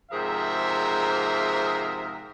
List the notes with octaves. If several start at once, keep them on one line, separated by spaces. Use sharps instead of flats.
G#2 C3 F3 G#4 A#4 E5